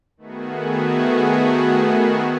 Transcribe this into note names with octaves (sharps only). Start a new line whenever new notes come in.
D#3 A3 B3 F#4 G#4